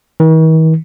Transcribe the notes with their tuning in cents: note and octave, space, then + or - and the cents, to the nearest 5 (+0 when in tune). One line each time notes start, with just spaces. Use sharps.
D#3 +45